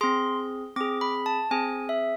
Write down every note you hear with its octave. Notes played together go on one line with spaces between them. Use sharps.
C4 G#4 C6
C4 G#4 D6
B5
A5
C4 G#4 G#5
E5